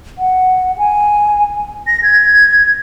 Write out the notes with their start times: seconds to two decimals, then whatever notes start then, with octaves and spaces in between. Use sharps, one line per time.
0.18 F#5
0.78 G#5
1.87 A#6
2.03 G#6